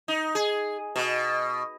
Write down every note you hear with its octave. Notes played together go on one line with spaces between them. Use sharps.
D#4
G#4
B2